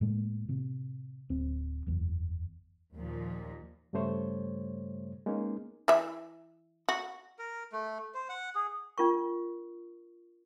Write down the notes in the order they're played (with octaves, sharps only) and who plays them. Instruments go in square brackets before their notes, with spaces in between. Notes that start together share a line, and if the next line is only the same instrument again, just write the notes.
[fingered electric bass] A2 G#3 A#3
A2 C3
D1 C4
F#1 E2
[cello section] D#2 A#2 F3
[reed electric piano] G2 C#3 G3 A3 C5 C#5
G#3 A#3 B3 C#4 D#4
[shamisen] E3 E5
F#4
[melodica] A#4
A3
C5
F#5
G#4
[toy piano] D4 F4 A#4 C#6